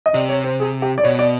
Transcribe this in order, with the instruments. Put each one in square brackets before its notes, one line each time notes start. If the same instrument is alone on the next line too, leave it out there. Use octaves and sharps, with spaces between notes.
[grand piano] D#5
[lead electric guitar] C3 [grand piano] D5
[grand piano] C#5
C5
G#4
G4
D5
[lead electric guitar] B2 [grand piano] C#5
[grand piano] D5